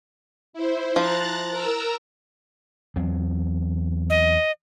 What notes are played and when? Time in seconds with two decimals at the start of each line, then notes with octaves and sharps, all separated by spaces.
0.53 E4 C5
0.96 F3 A#5 F#6 A6
1.51 A#4 A#5 E6
2.96 E2 F#3 C4
4.10 D#5